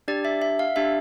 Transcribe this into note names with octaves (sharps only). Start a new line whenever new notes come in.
D4 G4 D5
E5
E5
F5
D4 G4 E5